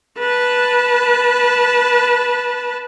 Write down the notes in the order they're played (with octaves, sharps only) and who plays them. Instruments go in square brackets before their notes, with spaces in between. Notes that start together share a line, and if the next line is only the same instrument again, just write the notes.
[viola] B4 A5